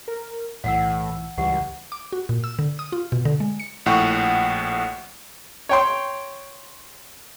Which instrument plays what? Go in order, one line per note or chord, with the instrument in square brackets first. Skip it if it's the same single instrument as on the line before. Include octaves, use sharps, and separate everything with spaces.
[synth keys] A#4
[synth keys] B1 E3 E6 [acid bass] A2 [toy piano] F5 F#5
[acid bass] C#2 [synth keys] E3 G3 [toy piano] G4 F#5
[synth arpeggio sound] D6
F#4
A#2
E6
D3
D#6
F4
B2
D3
G#3
C#7
[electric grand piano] A#1 A2 F#5 G5 C#6
[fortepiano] C#5 G5 C6